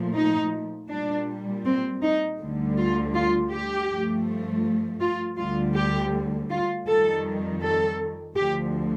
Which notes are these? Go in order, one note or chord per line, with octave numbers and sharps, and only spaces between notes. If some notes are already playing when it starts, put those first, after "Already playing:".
Already playing: A#2 F3 A3
D#4
A#2 G3 D4
C4
D#4
D2 D3 G3
F4
F4
G4
G2 F3 A3
F4
D2 D3 G3 F4
G4
F4
F2 D#3 G3 A4
A4
D2 D3 F3 G4